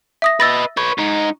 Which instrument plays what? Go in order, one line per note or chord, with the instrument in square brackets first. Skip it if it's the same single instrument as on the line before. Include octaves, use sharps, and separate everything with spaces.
[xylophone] E5 D#6 A#6
[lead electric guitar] B4 D#5 [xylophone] E6 A6 A#6
[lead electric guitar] B4 C#5 [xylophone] C#6
[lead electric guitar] G#2 D#4